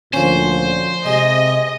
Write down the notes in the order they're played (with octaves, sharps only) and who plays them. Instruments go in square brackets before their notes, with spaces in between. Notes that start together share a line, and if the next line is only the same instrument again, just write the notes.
[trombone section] D2 A#2 D3 [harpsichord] F3 C#4 [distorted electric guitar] C5
[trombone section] C3 [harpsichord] G#3 [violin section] D#5